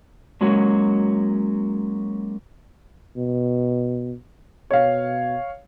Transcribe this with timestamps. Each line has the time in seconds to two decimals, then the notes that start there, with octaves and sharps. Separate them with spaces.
0.41 F#3 G#3 A#3 C#4 F#4 C#5
3.16 B2
4.71 B2 C#5 F5